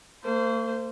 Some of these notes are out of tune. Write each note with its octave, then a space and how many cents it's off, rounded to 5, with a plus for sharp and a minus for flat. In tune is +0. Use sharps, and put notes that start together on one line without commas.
A#3 -45 C5 -15